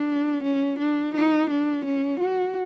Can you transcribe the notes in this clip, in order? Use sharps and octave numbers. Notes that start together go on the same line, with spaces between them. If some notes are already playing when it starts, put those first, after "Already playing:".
Already playing: D4
C#4
D4
D#4
D4
C#4
F#4